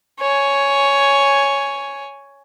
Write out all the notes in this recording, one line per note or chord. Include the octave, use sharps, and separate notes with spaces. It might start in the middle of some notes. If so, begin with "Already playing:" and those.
C#5 G#5